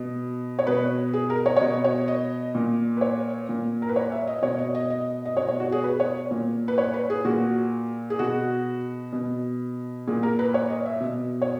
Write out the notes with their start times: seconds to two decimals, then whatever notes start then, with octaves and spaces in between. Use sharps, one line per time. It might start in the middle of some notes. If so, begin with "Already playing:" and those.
Already playing: B2
0.59 C#5
0.67 B2 B4
1.13 G#4
1.30 A#4
1.46 C#5
1.57 C#5
1.60 B2 D#5
1.84 C#5
2.08 D#5
2.55 A#2
2.97 B4
3.01 C#5
3.49 A#2
3.82 A#4
3.89 B4
3.96 C#5
4.12 E5
4.27 D#5
4.42 B2 C#5
4.59 D#5
4.75 D#5
4.90 D#5
5.25 D#5
5.37 B2 C#5
5.49 C#5
5.60 F#4
5.72 G#4
5.84 B4
6.00 C#5
6.31 A#2
6.68 B4
6.78 C#5
6.94 B4
7.10 G#4
7.25 A#2 F#4
8.10 G#4
8.19 B2 F#4
9.13 B2
10.08 A#2 G#4
10.23 A#4
10.39 B4
10.54 C#5
10.70 D#5
10.86 E5
11.00 B2
11.42 C#5